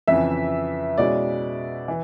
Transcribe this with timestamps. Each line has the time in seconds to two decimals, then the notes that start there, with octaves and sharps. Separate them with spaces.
0.08 F2 C#3 E3 E5
0.98 B2 G#3 C#4 E4 D5
1.88 E3